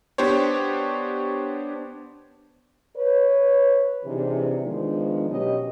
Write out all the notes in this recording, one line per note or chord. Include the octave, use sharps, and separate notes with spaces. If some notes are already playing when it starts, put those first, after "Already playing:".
B3 D4 G4 C5 C#5
B4 C#5
C3 E3 D4 D#4 G#4
D#3 F3 G#3 B3 D4
B2 F#3 C#4 G4 D#5